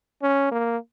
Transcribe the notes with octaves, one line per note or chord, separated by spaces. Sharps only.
C#4
A#3